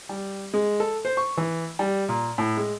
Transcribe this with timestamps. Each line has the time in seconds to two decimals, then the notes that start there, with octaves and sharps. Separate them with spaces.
0.09 G3
0.54 G#3
0.80 A4
1.05 C5
1.17 C#6
1.37 E3
1.79 G3
2.09 A#2
2.38 A2
2.57 G#3